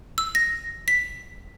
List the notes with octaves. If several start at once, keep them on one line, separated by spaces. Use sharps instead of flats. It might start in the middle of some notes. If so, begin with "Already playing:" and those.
E6
A#6
B6